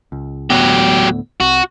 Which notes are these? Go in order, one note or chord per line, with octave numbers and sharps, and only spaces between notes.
C#2
D2 A2 F#3 B3 G4
C2 F#4